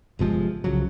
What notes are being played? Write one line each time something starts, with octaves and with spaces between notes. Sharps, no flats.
G1 C3 F3 G#3
C2 C#3 F3 F#3